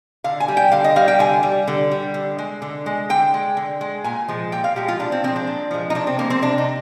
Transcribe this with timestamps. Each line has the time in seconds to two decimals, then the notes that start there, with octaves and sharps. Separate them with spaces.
0.24 D3 F5
0.40 G#5
0.48 G3
0.57 G5
0.72 D3 F5
0.84 D#5
0.96 G3 F5
1.08 G5
1.19 D3 G#5
1.43 G3
1.68 D3
1.91 G3
2.14 D3
2.38 G#3
2.62 D3
2.86 G#3
3.10 D3 G5
3.34 G#3
3.57 D3
3.81 G#3
4.04 A#2 G#5
4.28 F3 G#3
4.52 A#2 G5
4.64 F5
4.76 F3 G#3 G4
4.88 F4
4.99 A#2 D4
5.12 C4
5.24 F3 C4
5.28 G#3
5.36 D4
5.47 A#2
5.71 F3 G#3
5.90 D#4
5.95 C3 D4
6.07 C4
6.19 F3 G#3 A#3
6.30 C4
6.42 C3 D4
6.58 D#4